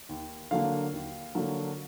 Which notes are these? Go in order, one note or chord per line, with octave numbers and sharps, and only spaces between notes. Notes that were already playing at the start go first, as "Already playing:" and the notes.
D#2
D3 F#3 A#3 D4 F5
D#2
D3 F#3 A#3 D4